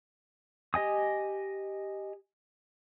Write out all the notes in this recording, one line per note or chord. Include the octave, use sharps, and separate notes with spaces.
G4 D#5 G#5 D#6